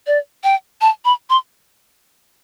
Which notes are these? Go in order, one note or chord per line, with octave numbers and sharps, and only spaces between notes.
D5
G5
A5
B5
C6